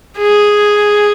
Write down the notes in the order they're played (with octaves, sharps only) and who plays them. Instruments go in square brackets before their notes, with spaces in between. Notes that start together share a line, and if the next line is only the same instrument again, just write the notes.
[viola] G#4